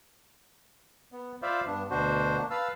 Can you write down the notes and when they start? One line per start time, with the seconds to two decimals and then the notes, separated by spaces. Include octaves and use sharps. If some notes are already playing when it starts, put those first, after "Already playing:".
1.12 B3
1.42 F4 C5 D5 E5 F5 B5
1.67 G2 B3 D4
1.90 D2 B2 D4 F#4 C5
2.38 A#3 D4
2.50 B4 F5 A5 E6